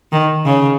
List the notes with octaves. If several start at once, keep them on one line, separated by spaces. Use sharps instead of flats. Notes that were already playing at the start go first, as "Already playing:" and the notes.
D#3
C#3